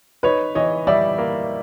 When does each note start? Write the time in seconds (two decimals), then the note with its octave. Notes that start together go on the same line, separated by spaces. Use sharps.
0.23 D#4 B4 C#5
0.55 E3 C#5 D#5
0.87 G3 D5 E5
1.18 A#3